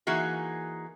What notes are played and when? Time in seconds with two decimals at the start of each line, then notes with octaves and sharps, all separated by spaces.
0.07 E3 A#3 D#4 F#4 G#4